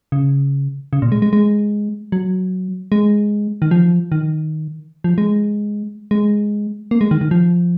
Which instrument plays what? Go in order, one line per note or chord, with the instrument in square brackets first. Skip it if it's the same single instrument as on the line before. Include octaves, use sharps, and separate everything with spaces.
[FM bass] C#3
C#3
A#2
G#3
G#3
G#3
F#3
G#3
D#3
F3
D#3
F3
G#3
G#3
A#3
G#3
D#3
D#3
F3